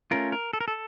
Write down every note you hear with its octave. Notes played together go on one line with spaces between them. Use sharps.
A3 C#4 F4 A#4
A#4
A4
A#4
A4